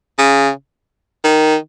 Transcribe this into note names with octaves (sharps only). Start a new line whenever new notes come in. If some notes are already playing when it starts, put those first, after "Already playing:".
C#3
D#3